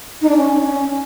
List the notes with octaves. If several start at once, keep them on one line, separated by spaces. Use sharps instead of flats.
D#4
D4
C#4
C#4